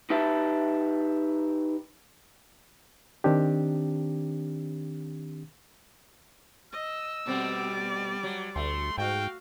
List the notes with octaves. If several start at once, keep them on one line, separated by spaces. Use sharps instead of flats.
D#4 G4 B4 E5 A5
D#3 C4 D4 G4
D#5 E6
B2 G3 A3 C4 D5
F#3
D2 A3 C6
G#2 F#4 F5 G5